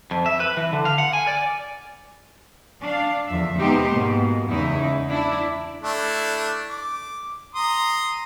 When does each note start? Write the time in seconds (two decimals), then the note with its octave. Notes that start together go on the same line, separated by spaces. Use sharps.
0.11 F2
0.26 E5
0.40 B4
0.57 E3
0.73 D3
0.85 F5
0.98 F#5
1.13 G#5
1.27 D5
2.81 D4 F5
3.27 E2 D3 F3 E5
3.58 C3 G#3 B3 D#4 G4 C5
3.92 G#2 B2 A#3
4.48 E2 C#3 G#3 D#4 E4
5.10 D4 E4
5.83 A3 D4 E4
6.71 D6
7.55 A#5 C6 D#6